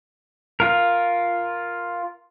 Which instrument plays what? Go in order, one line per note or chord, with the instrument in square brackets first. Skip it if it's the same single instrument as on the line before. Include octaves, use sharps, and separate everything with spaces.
[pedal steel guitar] F4 A#4